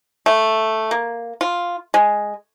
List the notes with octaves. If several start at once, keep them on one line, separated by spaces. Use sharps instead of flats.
A3
A#3
F4
G#3